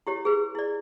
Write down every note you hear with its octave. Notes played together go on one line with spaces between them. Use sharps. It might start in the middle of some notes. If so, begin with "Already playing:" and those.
E4 G4 C#5
G#4 B4
E4 D5